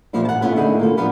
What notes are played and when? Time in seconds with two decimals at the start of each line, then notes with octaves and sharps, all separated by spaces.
0.13 A#2 E3 F3 G3 A#3
0.25 F#5 A5
0.41 A3 B3 C#4 E4 F4
0.56 D3 D#3 A3 D#4 E4 G#4
0.79 A#3 F4 A4
0.97 F3 B3 D4 F4 G4